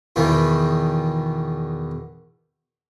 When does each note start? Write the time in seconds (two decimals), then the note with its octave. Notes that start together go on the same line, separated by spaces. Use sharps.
0.16 E2 B2 D#3 E3